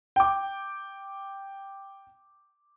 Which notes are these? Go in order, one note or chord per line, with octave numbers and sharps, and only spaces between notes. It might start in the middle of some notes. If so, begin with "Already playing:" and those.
G5 D6